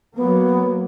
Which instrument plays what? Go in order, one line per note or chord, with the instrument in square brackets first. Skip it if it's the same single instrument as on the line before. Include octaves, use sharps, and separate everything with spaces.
[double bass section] F#3 A#3 [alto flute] B3